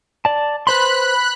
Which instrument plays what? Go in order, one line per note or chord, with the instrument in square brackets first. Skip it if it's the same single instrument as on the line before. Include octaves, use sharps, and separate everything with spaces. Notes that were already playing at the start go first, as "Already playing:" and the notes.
[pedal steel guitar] D5 A5
[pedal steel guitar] B4 C5 C6 [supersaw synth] B5 F#6